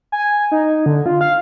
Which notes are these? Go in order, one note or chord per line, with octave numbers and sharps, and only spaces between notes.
G#5
D#4
D3
F4
F5